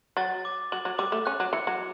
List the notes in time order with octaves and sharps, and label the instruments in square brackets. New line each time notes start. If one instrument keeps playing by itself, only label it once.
[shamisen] F#3 [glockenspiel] A6
[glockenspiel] D6
[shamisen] F#3 [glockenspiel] F#7
[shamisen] F#3
[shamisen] G3 [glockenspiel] D6
[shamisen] A3
[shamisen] C#4 [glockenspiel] F#6
[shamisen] F#3
[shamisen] E3 [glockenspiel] C#7
[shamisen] F#3